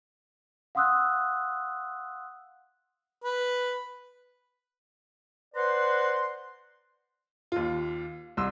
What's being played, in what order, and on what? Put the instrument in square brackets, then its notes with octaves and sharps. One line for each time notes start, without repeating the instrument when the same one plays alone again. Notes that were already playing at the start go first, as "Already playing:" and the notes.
[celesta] F5 F#5 C6 D#6 E6 F#6
[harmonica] B4
[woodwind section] B4 C5 D5 F#5 A#5 C6
[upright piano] D#2 F4
C2 C6 E6